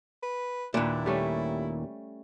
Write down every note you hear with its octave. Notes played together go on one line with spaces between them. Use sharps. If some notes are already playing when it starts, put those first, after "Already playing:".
B4
D#2 A#2 D4 E4 B4
G3 A3 C#4